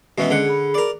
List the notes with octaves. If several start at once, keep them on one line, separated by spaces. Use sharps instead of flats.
B2 E3 G#3 B3 C#4 D#5
D3 G#4 F#5
G#4 B5
A#4 D5